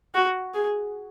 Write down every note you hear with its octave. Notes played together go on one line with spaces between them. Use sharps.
F#4
G#4